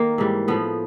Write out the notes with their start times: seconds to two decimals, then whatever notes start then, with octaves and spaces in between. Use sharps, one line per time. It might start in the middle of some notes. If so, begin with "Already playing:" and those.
Already playing: D#3 A#3
0.18 G#2 E3 G3
0.48 A2 F3 B3